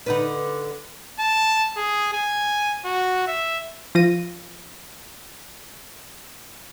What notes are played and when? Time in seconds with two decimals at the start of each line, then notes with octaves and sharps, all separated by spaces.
0.06 D3 D#4 B4
1.20 A5
1.77 G#4
2.13 G#5
2.85 F#4
3.27 E5
3.95 F3 F4 A#6 D#7